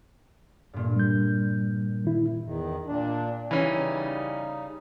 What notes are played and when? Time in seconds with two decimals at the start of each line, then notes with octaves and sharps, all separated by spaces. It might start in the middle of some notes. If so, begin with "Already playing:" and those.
0.73 G2 A#2
0.96 G3 G6
2.05 D#3 E4
2.44 E2 D#3
2.87 A#2 D4
3.51 C#3 E3 G3 C#4 D#4